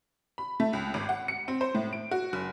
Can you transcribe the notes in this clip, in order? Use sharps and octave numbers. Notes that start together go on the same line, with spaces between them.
B5
A3
C#2
G#1
F#5
C#7
C4
C5
A2
D7
F#4
F#1